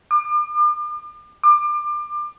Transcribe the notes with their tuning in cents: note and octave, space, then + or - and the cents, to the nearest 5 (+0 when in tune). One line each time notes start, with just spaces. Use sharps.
D6 +40
D6 +30